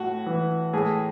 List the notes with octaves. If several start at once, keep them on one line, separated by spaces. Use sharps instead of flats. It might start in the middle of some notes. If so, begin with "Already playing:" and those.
Already playing: A2 F#4
E3
A2 G#4